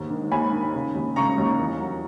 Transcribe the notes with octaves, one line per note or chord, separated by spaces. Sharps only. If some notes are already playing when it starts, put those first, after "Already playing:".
Already playing: D#2 G#2
D#3
D#2 G#5 B5
D#3
C#3
D#2
C#3 A#5 C#6
D#2
E2
F#3